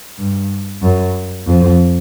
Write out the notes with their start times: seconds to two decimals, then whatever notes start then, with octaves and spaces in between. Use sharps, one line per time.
0.19 G2
0.83 F#2
1.47 F2